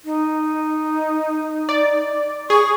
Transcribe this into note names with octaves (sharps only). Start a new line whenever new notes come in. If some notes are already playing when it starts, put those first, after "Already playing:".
D#4
D5
G#4 C#6